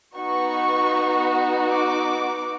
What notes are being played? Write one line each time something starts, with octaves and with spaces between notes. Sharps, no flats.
B3 D#4 F#4 C#6
D6